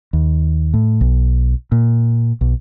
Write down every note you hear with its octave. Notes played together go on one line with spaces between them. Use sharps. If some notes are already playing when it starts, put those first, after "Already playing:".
D#2
A2
B1
A#2
B1